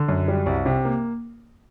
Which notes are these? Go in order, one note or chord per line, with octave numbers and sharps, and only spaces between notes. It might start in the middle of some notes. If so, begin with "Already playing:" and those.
Already playing: D3
F#2
G3
C2
C3
A#3